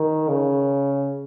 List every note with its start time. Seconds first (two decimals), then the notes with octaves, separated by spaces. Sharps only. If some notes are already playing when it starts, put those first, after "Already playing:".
Already playing: D#3
0.29 C#3